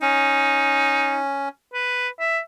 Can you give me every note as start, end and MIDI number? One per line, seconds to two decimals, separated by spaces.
0.02 1.49 61
0.02 1.21 63
1.74 2.08 71
2.20 2.39 76